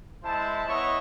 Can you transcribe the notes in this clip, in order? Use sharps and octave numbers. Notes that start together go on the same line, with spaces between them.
G#3 E4 C5 A5
B3 E4 C#5 D#5 E5 C#6